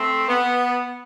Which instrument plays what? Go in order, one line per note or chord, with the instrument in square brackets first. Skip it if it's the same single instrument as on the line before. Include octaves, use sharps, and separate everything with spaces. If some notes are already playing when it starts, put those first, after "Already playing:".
Already playing: [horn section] A3 C4
B3